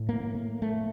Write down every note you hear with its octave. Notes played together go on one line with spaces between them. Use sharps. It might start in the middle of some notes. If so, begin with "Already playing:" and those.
Already playing: A2
A#3
A#3
A3